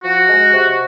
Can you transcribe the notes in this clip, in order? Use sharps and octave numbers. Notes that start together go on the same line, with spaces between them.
F3 F#4
G#3
C3